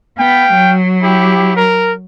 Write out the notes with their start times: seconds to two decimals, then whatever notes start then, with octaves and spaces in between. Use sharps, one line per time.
0.18 B3 F5 G5
0.54 F#3
1.03 E4 G4
1.56 A#4